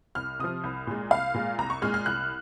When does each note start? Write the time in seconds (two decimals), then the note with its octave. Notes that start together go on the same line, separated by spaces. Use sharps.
0.15 C2 F6
0.39 C3 F3 D#6
0.64 C2
0.87 A#2 G#3
1.10 C2 F5
1.34 A#2 G#3
1.58 C2 A#5
1.70 C#6
1.82 A#2 G#3 F6
1.94 F6
2.06 C2 F#6